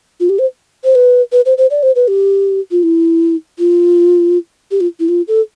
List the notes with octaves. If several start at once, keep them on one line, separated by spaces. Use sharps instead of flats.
F4
G4
C5
C5
B4
B4
C5
C5
D5
C5
B4
G4
F4
E4
F4
G4
F4
E4
F4
A4